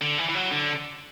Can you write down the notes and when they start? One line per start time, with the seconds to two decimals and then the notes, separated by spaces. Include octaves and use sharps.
0.01 D3
0.18 E3
0.29 E3
0.35 F#3
0.51 D3